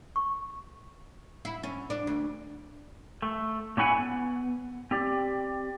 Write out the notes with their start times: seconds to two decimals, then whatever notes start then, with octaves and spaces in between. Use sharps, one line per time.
0.16 C#6
1.45 E4
1.63 C#4
1.90 D4
2.07 D2
3.22 A3
3.77 A#2 C#4 E4 F#5 G#5
3.97 B3
4.91 C4 G4 D5